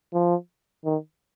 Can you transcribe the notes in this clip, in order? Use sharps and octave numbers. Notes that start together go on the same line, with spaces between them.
F3
D#3